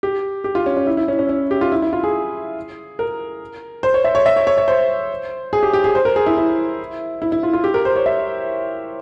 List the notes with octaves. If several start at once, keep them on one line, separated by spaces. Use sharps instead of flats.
G4
G4
F4
C#4
C#4
E4
E4
C#4
C#4
C#4
G4
F4
E4
E4
F4
G#4
A#4
C5
C#5
E5
C#5
E5
C#5
C#5
C#5
C5
G#4
G4
G4
G#4
C5
A#4
G#4
E4
E4
E4
E4
F4
F4
G4
A#4
C5
C#5
E5